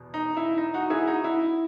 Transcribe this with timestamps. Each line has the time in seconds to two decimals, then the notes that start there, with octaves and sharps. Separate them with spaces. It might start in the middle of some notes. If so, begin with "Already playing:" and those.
Already playing: E2 B2
0.14 D#4
0.37 E4
0.58 D#4
0.74 D#4 F#4
0.90 E4 G#4
1.07 D#4 F#4
1.24 E4